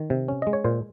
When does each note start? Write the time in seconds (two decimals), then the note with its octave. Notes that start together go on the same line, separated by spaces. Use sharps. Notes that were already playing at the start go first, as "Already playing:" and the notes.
Already playing: D#3
0.10 C3
0.28 C#4
0.42 G#3 D#5
0.53 C#5
0.64 A#2 C5